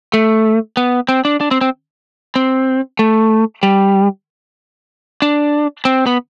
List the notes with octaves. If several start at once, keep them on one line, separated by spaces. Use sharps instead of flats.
A3
B3
C4
D4
D4
C4
C4
C4
A3
G3
D4
C4
B3